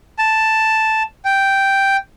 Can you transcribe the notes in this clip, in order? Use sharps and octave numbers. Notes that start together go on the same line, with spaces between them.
A5
G5